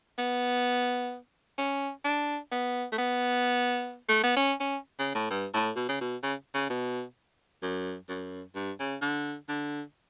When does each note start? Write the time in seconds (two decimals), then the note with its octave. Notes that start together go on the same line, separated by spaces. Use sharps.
0.18 B3
1.58 C#4
2.05 D4
2.52 B3
2.92 A3
2.98 B3
4.09 A3
4.23 B3
4.37 C#4
4.60 C#4
4.99 C#3
5.15 A2
5.30 G2
5.54 A2
5.76 B2
5.88 C#3
6.01 B2
6.23 C#3
6.54 C#3
6.70 B2
7.62 F#2
8.09 F#2
8.55 G2
8.80 C#3
9.02 D3
9.49 D3